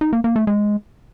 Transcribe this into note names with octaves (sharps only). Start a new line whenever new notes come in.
D#4
A#3
A#3
A3
G#3